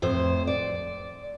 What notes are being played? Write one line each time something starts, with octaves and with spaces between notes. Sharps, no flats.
F2 A2 C5
D5